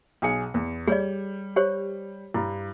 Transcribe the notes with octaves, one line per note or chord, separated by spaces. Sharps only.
B1 G#4 C#7
E2
G3 G#4 C#5 D5
G4 C5 C#5
G2 E4